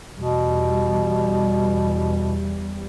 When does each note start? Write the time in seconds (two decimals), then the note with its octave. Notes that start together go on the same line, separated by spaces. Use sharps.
0.15 E2 B2 G3